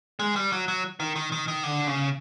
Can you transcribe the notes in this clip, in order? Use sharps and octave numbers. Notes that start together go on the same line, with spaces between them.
G#3
G3
F#3
F#3
D#3
D#3
D#3
D#3
D3
C#3